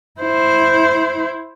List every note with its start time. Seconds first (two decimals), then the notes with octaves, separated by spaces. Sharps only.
0.21 E4 C5